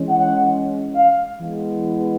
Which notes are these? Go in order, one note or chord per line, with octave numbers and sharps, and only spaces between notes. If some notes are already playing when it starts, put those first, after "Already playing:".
Already playing: E3 G#3 C#4
F#5
F5
E3 G#3 B3